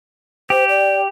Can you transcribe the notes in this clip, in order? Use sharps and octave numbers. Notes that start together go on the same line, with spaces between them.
G4 C5
D5